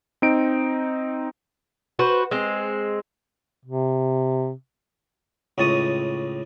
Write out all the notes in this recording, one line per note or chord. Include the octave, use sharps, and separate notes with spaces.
C4 D#4 D7
F#4 B4 C5
G#3 C4
C3
C#2 A2 A5 C#6 D#6